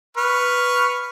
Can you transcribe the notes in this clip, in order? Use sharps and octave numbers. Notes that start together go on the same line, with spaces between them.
B4 C#6 F6